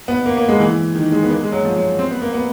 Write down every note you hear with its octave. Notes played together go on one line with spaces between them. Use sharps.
B3
A#3
A#3
G#3
E3
D#3
G#3
B3
A#3
G#3
F#3
F3
F#3
C4
B3
A#3
B3